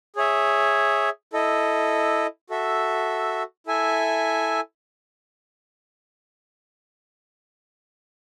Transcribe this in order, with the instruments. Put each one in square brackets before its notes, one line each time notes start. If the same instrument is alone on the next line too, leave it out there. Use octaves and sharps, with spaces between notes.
[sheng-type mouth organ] G#4 C#5 E5
E4 A4 D#5
F#4 A4 E5
E4 A4 E5 G#5